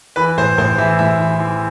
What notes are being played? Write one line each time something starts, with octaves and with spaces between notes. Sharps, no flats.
E3 B4
A1 C5
A1 C5
E3 E5
A1 E5
E3
E3